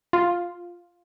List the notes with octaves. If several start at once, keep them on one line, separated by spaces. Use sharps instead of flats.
F4